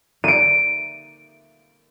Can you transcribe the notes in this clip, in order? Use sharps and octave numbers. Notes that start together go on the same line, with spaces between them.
D7 D#7